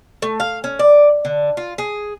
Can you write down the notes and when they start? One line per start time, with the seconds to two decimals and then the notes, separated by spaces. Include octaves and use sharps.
0.22 A3
0.40 F5
0.64 C#4
0.79 D5
1.25 D3
1.57 F4
1.78 G#4